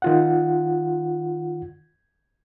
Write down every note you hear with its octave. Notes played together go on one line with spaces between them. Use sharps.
D#3 F4 F#5